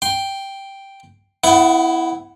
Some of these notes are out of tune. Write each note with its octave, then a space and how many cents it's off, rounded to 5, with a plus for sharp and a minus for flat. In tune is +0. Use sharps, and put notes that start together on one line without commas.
G5 +0 C6 +0
B3 +35 E4 +0 F#5 -15